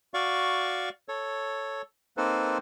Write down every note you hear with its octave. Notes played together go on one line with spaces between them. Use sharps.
F#4 D5 F5 C#6
A4 C#5
A#3 C4 D#4 A4 B4 C5